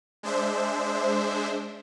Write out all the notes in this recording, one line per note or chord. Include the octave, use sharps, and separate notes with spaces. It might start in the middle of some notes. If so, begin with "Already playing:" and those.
G#3 D4 C5 E5